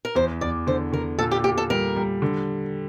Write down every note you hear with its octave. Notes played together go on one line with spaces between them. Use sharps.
A#4
E2 C5
E2 D5
D3 C5
D3 A#4
A#2 A4
G4
A#2 G4
A4
G3 A#4
G3
D3